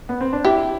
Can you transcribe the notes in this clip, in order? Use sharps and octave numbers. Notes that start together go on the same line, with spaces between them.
B3
C4
D4
E4 G4